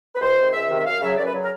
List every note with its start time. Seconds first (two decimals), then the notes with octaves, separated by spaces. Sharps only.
0.14 B4
0.20 C#2 C5
0.37 C3 D#3
0.53 C#2 E5
0.70 C3 D#3
0.78 E5
0.85 F#2 F5
1.02 C#3 F#3 E5
1.17 F#2 D5
1.25 B4
1.34 C#3 F#3
1.42 A#4